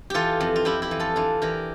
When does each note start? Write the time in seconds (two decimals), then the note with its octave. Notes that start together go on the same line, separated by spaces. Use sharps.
0.10 E3 F4 G4 A4
0.40 F2
0.56 F4
0.65 F2 E4 G4
0.82 E4 G4
0.91 E3
0.99 F4 A4
1.16 E3 D4 F4
1.42 E3 G4 A#4